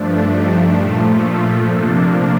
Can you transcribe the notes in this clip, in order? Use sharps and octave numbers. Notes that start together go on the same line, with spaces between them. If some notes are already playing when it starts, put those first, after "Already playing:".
Already playing: G2 F3 A3 D4
D#4 G4
A#2 F3 A3 F4 A4
F4 A4
C3 F3 A#3 D4 F4 A4